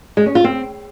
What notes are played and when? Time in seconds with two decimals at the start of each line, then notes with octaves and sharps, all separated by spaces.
0.17 G#3
0.26 C#4
0.35 F4
0.44 C4